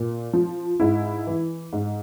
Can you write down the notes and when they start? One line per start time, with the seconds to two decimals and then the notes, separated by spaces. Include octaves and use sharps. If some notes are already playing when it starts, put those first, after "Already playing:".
Already playing: A#2
0.33 F3
0.80 G#2 E4
1.27 E3
1.73 G#2